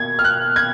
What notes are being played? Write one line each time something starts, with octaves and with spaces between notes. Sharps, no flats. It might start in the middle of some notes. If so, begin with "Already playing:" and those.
Already playing: B2 A#3 G#6
F6
F#6
G#6